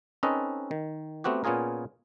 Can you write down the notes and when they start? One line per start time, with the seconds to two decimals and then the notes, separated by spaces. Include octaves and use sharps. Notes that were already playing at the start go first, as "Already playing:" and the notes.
0.23 C4 C#4 D#4 A4 B4 D#5
0.71 D#3
1.24 A3 B3 C4 F#4 G4
1.44 A#2 B3 C#4 F4 G#4 A#4